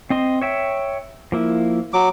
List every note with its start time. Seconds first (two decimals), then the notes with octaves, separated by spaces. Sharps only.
0.10 C4 D#5 C6
0.42 C#5 E5 G5
1.32 F3 A#3 E4
1.93 F#3 D6